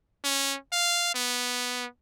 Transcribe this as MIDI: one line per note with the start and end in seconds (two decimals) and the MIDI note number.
0.24 0.57 61
0.72 1.11 77
1.15 1.86 59